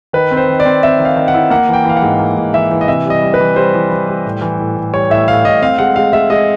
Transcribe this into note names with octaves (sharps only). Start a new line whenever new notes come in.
D#3 B4
C4
C5
D#3
D5
C4
C4 E5
D#3
F5
D#3
F#5
E4
A#3 F#5
E3 G5
E3 F5
F#5
G#2
A#3
G#2
E3 E5
E3
D#5
C3 E5
G3 D#5
G3
B4
E3
G3 C5
E3
E3
G3
A2
E3
A2
A2
G3 C#5
A2 E5
A2 F5
A2 D#5
C4 F5
G#3 F#5
G#3 F5
G#3 E5
G#3 D#5